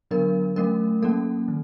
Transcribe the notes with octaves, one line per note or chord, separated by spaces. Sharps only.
D3 F#3 B3 D4 A#4
F#3 A3 C#4 A#4
F#3 A#3 C#4 A4
D#3